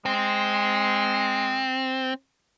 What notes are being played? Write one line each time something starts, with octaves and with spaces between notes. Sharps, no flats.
G#3 C4